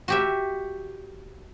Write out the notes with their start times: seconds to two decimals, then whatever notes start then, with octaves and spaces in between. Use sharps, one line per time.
0.08 F#4 G4 E5